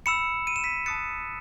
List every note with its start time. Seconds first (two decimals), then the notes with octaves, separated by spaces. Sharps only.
0.06 B5 E6 C#7 E7
0.47 D#7
0.56 E7
0.64 B6 D#7
0.86 A5 D#6 F#6 A6 C#7